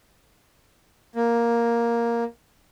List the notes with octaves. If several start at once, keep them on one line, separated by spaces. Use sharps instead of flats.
A#3